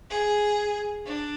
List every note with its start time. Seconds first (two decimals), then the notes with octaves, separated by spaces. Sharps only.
0.10 G#4
1.06 D4